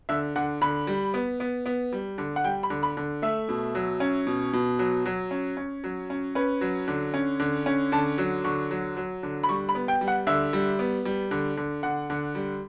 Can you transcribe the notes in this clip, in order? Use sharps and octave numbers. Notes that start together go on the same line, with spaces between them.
D3 E5
D3 F#5
D3 B5
G3
B3
B3
B3
G3
D3
F#5
G3 G5
B5
D3
B5
D3
A3 E5
B2
F#3
C#4
B2
B2
F#3
F#3
C#4
C#4
F#3
C#4
C#4 B4
F#3
D3
C#4
D3
C#4
D3 A5
F#3
D3 C#6
F#3
F#3
D3
B5
G3 C#6
B5
B3
G5
G3
F#5
D3 E5
G3
B3
G3
D3
D3
D3 F#5
D3
G3